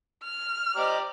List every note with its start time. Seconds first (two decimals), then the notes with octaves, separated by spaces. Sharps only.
0.24 F6
0.76 G4 C5 D5 D#5 A#5 D6